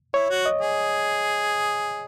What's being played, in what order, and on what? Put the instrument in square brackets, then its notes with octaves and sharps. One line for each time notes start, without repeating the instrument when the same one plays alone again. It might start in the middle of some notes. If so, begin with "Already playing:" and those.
[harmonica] E4 [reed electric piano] C#5
[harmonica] F#4
[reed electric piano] D#5
[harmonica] G#4